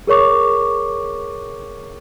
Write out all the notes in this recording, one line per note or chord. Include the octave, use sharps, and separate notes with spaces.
G#4 A#4 C#5 C#6 D6